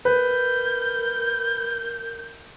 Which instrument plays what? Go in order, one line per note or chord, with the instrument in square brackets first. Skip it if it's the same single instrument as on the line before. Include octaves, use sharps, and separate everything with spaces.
[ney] A#4 [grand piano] B4 [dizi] G6